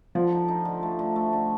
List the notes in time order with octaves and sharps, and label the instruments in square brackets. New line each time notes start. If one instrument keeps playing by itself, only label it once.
[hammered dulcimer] D3 [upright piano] F3
[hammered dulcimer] D#4
D#4
D3
A3
D3
A3
D3